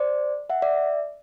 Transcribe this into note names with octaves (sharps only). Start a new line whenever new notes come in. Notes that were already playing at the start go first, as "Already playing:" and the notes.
Already playing: C5 D5
E5 F#5
D5 E5